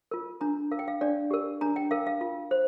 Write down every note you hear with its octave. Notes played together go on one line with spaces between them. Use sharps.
F4 A#4
D4 A#5
A#4 F5
G5
F5
D4 D5
G4 A#4
D4 A#5
G5
A#4 F5
F5
F4
C5